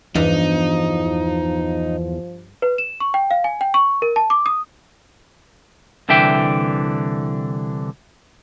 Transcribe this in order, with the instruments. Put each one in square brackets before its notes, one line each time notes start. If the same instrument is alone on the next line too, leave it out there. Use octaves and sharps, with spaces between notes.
[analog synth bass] E2 [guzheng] G2 [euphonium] F3 [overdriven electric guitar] D#4
[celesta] B4
E7
C#6
G5
F5
G#5
G5
C#6
A#4
A5
D6
D#6
[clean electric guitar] C2 D3 E3 E5 G5